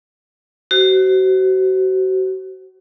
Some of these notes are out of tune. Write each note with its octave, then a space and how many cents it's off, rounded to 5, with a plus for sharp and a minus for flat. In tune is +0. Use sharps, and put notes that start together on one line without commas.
F#4 +35 C5 +0